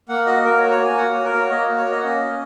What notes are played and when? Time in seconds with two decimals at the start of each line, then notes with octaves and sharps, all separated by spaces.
0.09 A#3 F#5
0.26 F#4 D#5
0.45 A#3 A#4
0.58 C#5
0.63 F#4
0.71 C#5
0.80 A#3 G#5
0.98 F#4 F#5
1.11 F#4 C#5
1.25 A#4
1.33 A#3 C#5
1.51 A#3 D#5
1.68 F#4
1.77 C#5
1.86 A#3 D#5
2.00 F#5
2.04 C#4 D#5
2.21 A#3